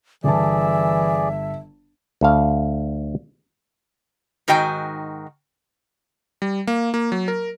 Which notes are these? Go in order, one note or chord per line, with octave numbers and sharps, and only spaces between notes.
G1 E3 G#4 D5 E5 A5
D2 A4 F5
G#2 D#3 F#4 G5 G#5
G3
A#3
A#3
F#3
A#4